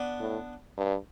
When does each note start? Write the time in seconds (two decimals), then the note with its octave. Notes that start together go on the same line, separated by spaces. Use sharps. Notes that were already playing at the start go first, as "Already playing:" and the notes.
Already playing: B3 D4
0.20 A2
0.77 G2